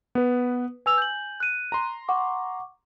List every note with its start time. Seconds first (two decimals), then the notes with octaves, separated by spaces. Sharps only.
0.15 B3 B4
0.86 B4 G#5 E6 F7
0.98 G6 F#7
1.40 F#6 D#7
1.72 A#5 C6
2.08 F#5 C#6 D6